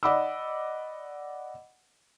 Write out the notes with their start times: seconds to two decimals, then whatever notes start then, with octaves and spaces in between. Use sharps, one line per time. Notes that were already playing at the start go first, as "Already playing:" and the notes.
0.03 D5 D#5 F#5 B5 D6 E6